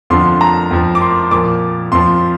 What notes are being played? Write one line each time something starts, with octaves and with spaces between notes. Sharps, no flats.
F2 D3 F3 C6
A#5
F2 F3
D6
C6
A#2 F3 D6
F2 F3 C6